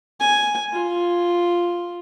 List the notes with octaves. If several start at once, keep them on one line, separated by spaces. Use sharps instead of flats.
G#5
F4